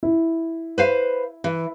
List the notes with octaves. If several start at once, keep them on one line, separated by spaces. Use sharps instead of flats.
E4
B4 C5 F5
E3